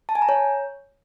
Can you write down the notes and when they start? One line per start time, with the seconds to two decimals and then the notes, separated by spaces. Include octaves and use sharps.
0.09 A5
0.15 G#5
0.22 A#5
0.29 C#5